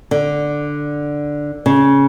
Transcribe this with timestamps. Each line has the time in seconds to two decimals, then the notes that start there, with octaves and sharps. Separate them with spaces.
0.11 D3
1.66 C#3